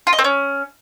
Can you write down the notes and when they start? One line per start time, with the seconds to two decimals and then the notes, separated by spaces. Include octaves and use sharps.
0.07 F4
0.13 D#5
0.19 C4
0.24 C#4